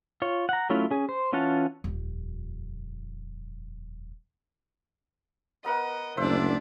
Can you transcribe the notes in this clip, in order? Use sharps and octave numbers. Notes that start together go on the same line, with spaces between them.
F4 C#5
F#5 A#5
F#3 A3 C#4 E4 F4
C#4 G#4
C5
E3 C#4 F4 F#5 A5
D#1 F2
B3 A#4 D#5 F#5
F#1 D2 D4 C5 D5 E5